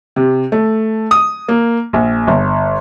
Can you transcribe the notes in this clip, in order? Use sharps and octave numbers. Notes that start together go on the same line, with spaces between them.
C3
A3
D#6
A#3
A#1
G1